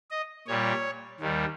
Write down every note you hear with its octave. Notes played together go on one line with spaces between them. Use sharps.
D#5
A#2 G3 C#5
D#2 D#3 G3